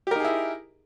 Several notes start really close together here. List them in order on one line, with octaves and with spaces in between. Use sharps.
G4 A#4 D#4 G#4 E4